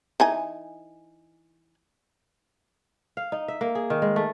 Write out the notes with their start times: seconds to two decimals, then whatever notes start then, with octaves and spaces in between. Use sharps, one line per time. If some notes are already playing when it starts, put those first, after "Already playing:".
0.20 E3 D#4 G#5
3.17 F5
3.32 D#4
3.48 E5
3.61 A#3
3.75 G#4
3.90 D#3
4.02 G#3
4.16 A3